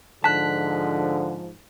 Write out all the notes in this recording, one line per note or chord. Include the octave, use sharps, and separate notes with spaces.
G#2 D3 F3 A5 F#6 B6